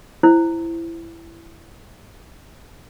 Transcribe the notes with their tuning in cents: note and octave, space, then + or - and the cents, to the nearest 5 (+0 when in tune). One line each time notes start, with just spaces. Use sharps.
E4 +15 C5 +0